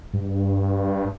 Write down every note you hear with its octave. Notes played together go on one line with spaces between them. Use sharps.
G2